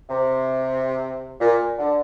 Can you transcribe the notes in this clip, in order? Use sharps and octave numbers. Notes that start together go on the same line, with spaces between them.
C3
A#2
D3